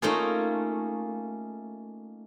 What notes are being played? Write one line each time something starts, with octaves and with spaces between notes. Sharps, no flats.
A3 A#3 C#4 D#4 F4 G#4